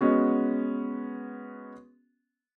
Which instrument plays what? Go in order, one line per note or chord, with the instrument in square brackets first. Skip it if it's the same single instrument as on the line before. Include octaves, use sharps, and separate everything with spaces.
[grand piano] G#3 B3 C#4 F#4